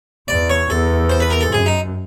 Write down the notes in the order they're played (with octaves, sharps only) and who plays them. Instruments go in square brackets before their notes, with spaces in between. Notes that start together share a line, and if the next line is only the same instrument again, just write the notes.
[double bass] E2 [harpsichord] D5
[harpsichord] C#5
[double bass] E2 [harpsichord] A4
[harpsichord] C5
B4
A#4
A4
[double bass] F#2 [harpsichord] G#4
[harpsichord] D#4